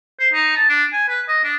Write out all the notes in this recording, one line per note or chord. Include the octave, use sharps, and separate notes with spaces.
C5
D#4
A5
D4
G#5
B4
D#5
D4